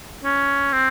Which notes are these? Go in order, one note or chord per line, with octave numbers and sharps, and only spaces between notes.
C#4
C4